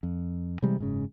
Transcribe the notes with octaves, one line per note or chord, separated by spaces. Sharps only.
F2
C3 E3 G3 G#3
F#1 G#2 C#3